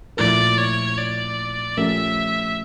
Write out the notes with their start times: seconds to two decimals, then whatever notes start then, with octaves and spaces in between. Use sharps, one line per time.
0.17 A#2 F3 A3 E4 A#4 D5
0.58 C#5
0.97 D5
1.77 F3 A3 C#4 G4 A#4 E5